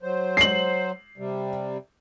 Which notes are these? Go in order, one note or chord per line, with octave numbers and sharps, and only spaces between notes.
F#3 C5
C7 F#7
C3 G3